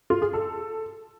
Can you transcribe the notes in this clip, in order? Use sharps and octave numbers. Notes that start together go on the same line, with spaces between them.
F4
G#4
A4